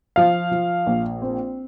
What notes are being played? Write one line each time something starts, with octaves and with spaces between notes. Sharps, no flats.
F3 F5
F3
A#1
C4